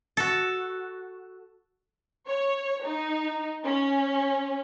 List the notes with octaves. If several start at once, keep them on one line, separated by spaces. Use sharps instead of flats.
F#4 A4
C#5
D#4
C#4